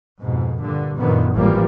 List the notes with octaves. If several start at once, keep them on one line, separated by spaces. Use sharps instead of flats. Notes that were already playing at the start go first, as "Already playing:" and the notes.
F2 G#2 B2
G2 A#2 D3
F#2 A#2 D3 D#3 F3 B3
G#1 A2 E3 F3 G3 A#3